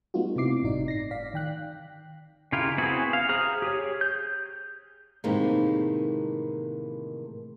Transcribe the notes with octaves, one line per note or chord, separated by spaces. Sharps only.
G3 A3 B3 D#4 F4 F#4
C3 C4 E4 D6 C7
G1 A2 D#4 D5
A#6 C7
D5 F5 B6
D#3 G5 F#6
C#3 E4 F4 G4 A#4
B3 C4 E4 F#4 G#4
F5
G#4 C5 A#5 D#6 F6
G4 G#4 C#5
G6
A2 C3 D#3 E3 G#3 A#3